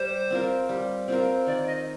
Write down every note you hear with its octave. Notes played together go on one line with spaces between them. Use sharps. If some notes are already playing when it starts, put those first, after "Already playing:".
Already playing: G3 C5
C4 F4 A#4
G3
C4 F4 A#4
D#3 D5
D#5